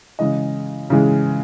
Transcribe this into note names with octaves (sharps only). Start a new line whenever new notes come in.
C#3 E3 G#3 D#5
C#3 E3 G#3